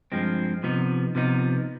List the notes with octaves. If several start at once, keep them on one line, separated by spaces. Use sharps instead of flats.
G2 F3 G#3 C4
C3 F3 B3 D#4
C3 F3 B3 D#4